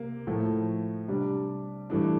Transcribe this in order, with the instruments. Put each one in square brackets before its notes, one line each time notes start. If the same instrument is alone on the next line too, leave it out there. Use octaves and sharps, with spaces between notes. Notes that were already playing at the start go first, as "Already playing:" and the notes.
Already playing: [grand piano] C3 A#3
A2 F3 A3
C3 G3 D4
G2 E3 A3 D4